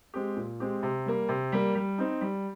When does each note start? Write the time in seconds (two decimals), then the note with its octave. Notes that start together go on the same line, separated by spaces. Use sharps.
0.14 G#3 C4 G4
0.37 A#2
0.60 G#3 C4 G4
0.83 C3
1.06 G3 A#3
1.29 C3
1.52 G3 A#3
1.75 G3
1.98 C4 D#4
2.21 G3